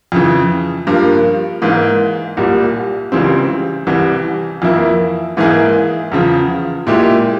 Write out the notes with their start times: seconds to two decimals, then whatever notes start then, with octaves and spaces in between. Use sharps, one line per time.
0.12 F2 C#3 E3
0.87 G2 F3 A#3
1.62 G#2 E3 A#3
2.37 C2 A#2 G3
3.12 C#2 C#3 E3 G3 C4
3.87 C2 C3 E3 G3
4.62 F2 E3 A#3 E4
5.37 G#2 E3 A#3 E4 G#4
6.12 E2 C#3 F3
6.87 A#2 G#3 E4 G4